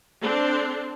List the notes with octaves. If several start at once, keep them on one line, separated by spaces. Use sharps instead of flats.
C4 D4 A4